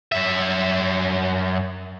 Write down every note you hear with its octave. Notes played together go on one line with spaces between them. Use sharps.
F#2 E5